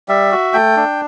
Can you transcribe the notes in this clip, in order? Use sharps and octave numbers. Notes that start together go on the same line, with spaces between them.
G3 E5
F#4
A3 G5
D4